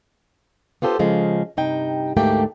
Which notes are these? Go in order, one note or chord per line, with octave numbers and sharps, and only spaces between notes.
B3 F4 G4 A4 B4 C5
C#3 F3 G#3
G2 C3 D#4 G5
D2 G#2 A3 A#3 G4 G5